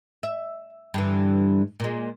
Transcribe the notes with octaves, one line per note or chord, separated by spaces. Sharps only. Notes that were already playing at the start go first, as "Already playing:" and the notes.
E5
G2 D3 E3
A#2 G#3